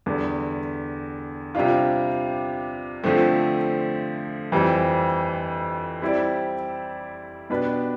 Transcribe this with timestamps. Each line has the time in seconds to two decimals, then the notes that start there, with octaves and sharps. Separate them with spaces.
0.06 E2 D3 G3
1.55 C3 G3 D4 F4
3.04 D3 F3 A3 C4
4.52 F2 E3 G3 C4
6.01 G3 C4 E4 G4 D5
7.50 B2 B3 D4 G4 B4